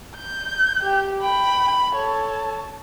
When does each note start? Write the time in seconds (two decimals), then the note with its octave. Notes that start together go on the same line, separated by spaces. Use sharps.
0.16 G6
0.82 G4 G5
1.21 G5 B5
1.95 A4 C#5 A5